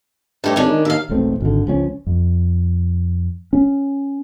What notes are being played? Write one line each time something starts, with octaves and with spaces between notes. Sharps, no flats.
G2 A3 G4 C#5
G#1 C#4 D4
D#3
D#2 E5 F5
E1 B1 A3 C4
G#1 D3
C#2 F3 C#4
F2
C#4